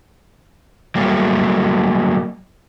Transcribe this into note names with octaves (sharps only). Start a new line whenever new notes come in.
F#3 G3 A3 A#3